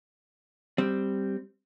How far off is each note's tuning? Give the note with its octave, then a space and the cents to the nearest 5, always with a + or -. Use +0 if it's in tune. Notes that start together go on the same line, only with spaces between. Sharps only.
G3 +0 C4 +0